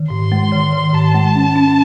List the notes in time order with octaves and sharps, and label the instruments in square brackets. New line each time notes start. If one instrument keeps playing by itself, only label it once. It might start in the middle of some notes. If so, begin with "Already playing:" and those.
Already playing: [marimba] D#3
[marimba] G#2 [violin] C6
[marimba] G#3
D#3
D#3
[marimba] G#2 [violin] A5
[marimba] G#3
C#4
C#4